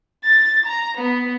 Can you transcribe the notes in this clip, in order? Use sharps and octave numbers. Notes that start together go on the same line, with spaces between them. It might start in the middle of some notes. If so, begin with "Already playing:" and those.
A6
A#5
B3